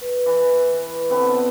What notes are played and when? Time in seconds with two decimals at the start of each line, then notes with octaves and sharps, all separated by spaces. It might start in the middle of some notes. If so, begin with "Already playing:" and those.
0.01 B4
0.26 E3
1.10 D3 B3 C4